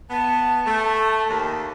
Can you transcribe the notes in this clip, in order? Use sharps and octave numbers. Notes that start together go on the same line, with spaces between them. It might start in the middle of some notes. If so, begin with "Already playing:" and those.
B3 A5
A3
D#2